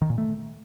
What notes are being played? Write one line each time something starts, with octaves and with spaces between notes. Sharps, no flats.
D#3
A#2
A3